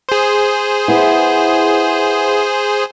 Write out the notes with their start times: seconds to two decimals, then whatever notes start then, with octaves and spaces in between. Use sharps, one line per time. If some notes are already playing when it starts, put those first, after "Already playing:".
0.09 G#4 C5
0.88 B3 E4